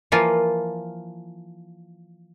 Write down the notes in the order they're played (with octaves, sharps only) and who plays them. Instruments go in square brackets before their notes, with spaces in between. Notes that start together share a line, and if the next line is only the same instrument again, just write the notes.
[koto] E3 F3 A#3 F4